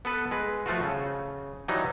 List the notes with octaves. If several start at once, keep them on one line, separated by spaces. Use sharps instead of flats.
B3 A4 B4
G#3 B4
F3 A3 F4 F#4
C#3
E3 F#3 G3 D#4